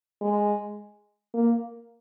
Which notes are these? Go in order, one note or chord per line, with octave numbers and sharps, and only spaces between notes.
G#3
A#3